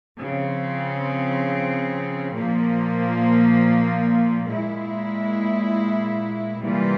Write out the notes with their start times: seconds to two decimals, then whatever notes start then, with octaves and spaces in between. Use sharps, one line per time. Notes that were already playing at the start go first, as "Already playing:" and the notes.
0.20 C#3 F3 C4
2.34 A#2 F3 A#3
4.48 A#2 G#3 E4
6.62 C3 E3 G3 A#3 F4